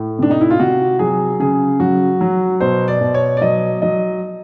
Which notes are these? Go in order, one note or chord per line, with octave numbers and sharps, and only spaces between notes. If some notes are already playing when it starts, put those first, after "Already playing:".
Already playing: A2
C3 D4
D#4
E4
F4
C3 F#4
F#3 G#4
C#3 G#4
F#3 F#4
F#3
B2 C5
D5
B2
C#5
D5
F#3 D#5
F#3 D#5